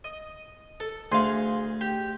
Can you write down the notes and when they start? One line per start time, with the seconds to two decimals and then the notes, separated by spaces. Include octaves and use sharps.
0.04 D#5
0.80 A4
1.12 D2 G#4 F5 C6
1.81 G4